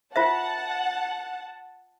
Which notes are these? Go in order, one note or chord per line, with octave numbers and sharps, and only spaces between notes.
F4 C5 E5 F#5 A5